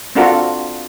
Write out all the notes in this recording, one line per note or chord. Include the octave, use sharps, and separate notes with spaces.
C4 D4 F4 F#4 A4 A#4